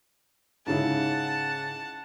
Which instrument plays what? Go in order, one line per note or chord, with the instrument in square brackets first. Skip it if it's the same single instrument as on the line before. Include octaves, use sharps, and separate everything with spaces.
[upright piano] G#2 C#3 E4 [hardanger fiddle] F#5 A5